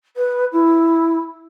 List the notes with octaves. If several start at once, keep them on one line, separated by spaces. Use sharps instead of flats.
B4
E4